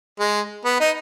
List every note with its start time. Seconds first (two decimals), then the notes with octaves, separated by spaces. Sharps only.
0.20 G#3
0.65 B3
0.80 D#4